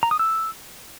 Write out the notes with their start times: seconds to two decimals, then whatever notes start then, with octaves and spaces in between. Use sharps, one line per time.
0.03 A#5
0.11 D#6
0.19 E6